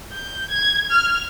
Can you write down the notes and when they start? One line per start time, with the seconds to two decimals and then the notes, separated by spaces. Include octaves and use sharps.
0.13 G6
0.50 G#6
0.91 F6